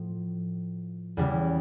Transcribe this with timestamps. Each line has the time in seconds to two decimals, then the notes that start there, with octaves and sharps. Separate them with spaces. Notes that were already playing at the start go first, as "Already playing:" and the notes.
Already playing: A2 F3
1.17 E2 C#3 G3